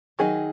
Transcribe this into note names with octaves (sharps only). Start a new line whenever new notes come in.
D#3 F#3 D#4 G#4